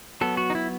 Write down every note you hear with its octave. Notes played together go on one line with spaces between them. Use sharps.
F#3 B3 A4
F#4
D#4
E4